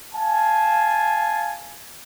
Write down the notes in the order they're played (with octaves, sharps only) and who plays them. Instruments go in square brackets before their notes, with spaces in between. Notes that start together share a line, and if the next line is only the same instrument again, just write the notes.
[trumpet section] F5 G#5 A5